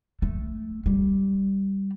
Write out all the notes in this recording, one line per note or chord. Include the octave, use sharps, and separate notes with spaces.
A3
G3